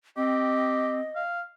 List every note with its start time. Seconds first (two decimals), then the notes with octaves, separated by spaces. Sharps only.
0.17 C4 G4 D#5
1.16 F5